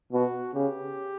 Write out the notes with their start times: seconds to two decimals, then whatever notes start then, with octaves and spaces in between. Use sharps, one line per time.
0.12 B2 F#4
0.54 C#3 G4